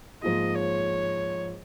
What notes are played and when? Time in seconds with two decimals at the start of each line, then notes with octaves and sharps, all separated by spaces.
0.23 G#2 F3 A#3 F4 G#4 D#5
0.55 C#5